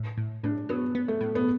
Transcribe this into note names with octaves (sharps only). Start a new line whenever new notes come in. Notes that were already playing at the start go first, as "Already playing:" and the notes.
Already playing: A2
A2
A2 D4
F#3 B3
B3
A3
A2
B3